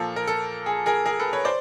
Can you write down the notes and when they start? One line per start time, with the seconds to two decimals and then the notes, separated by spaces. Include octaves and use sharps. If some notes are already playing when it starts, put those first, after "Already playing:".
Already playing: A#2 F3 A#3 A4
0.16 A#4
0.28 A4
0.66 G#4
0.86 G#4 A#4
1.06 G#4 A#4
1.20 A4 B4
1.33 B4 C#5
1.45 C5 D5